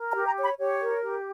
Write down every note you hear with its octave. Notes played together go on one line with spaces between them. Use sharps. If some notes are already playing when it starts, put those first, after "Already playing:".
Already playing: A#4
A#5
G4
A#5
C#5 B5
G4 C#5
A#4
G4